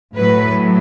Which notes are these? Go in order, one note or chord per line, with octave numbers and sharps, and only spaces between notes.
A2 F#3 B4